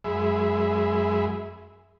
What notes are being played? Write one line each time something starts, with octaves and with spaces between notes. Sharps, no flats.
F#2 G#3 G#4 E5 B5